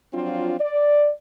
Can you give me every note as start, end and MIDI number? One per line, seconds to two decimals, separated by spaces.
0.14 0.55 53
0.14 0.55 54
0.14 0.55 60
0.14 0.55 62
0.14 0.55 65
0.60 1.10 74